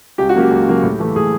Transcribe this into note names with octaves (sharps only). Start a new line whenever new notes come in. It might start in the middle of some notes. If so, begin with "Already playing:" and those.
C#2 G4
F#4
C#3 F#3 A#3 G4
C#2
C#3 F#3 A#3
A2
E3 A3
A2 G#4